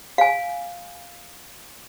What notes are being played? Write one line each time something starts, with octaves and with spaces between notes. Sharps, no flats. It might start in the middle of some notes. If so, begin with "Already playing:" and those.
F5 G#5